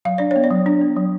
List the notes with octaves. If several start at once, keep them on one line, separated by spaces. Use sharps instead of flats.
F#3 F5
D4 D5
B3 C#5
D5
F#3
D4
B3
F#3